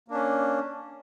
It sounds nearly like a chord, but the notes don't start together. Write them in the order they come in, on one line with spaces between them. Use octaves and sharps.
A#3 D4 C#4